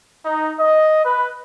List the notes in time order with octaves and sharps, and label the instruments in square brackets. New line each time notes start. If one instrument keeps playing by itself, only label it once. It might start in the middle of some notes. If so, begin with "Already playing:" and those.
[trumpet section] D#4
D#5
B4